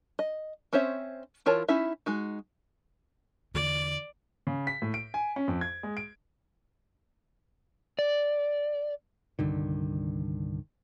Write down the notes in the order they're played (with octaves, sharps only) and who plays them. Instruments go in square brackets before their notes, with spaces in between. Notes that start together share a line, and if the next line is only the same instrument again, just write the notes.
[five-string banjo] D#5
C4 C#4 C5 C#5 E5
E3 F4 A#4 C#5 A5
C#4 D#4 E4 E5
G#3 D#4 F#4
[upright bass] E2 D3 [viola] D5
[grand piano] C#3
B6
A2
D7
G#5
C#4
F2
G#6
G#3
D7
[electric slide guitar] D5
[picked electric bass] C2 G2 D3 D#3